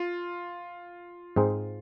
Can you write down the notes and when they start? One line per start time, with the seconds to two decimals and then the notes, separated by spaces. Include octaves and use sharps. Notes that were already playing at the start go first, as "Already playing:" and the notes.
Already playing: F4
1.36 G#2 G#3 C4 D#4